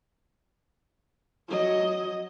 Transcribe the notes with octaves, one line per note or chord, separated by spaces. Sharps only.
F#3 D#5